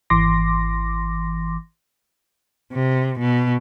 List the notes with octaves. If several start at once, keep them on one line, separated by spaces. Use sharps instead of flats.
G#1 E3 C6 D6 A#6
C3
B2